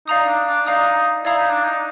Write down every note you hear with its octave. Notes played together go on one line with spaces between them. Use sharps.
D#4 D5 F5 A#5 D#6
D4
D4
D#4 D5 F5 A#5 D#6
E4 D5 F5 A#5 D#6
D#4
D4
D#4